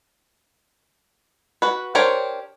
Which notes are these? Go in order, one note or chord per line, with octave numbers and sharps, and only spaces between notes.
F#4 B4
D4 G4 A#4 C5 C#5